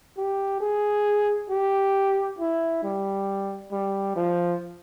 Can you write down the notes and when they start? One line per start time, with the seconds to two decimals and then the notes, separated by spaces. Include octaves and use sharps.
0.17 G4
0.61 G#4
1.50 G4
2.39 E4
2.83 G3
3.72 G3
4.16 F3